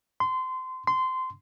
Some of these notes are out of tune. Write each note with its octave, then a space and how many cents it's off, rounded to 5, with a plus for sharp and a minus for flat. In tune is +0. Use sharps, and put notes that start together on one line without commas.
C6 -25
C6 -20